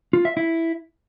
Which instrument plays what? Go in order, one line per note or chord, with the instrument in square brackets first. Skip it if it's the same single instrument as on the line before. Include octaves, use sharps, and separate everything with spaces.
[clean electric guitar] F4
E5
E4